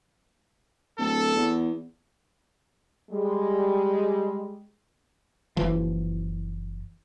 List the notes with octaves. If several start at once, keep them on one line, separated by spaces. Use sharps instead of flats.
D1 A4
E2
G3 G#3
F#1 E3 F3